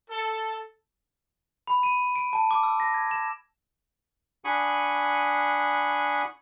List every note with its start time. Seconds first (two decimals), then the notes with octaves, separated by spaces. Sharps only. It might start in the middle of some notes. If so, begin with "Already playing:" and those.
0.10 A4
1.67 B5
1.83 D#7
2.16 D7
2.33 A5
2.51 D6
2.63 E6
2.80 A#6
2.94 G#6
3.11 E7
4.45 D4 F#5 G#5 B5 C#6 D#6